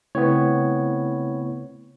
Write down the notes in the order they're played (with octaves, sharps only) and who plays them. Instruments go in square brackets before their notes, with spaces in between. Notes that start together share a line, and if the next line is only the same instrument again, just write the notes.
[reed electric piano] C#3 A3 E4 [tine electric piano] B3 C4 C#5